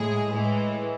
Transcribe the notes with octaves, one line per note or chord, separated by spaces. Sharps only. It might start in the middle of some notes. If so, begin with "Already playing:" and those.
Already playing: A2 G#3 G#4
A2 E3 G#3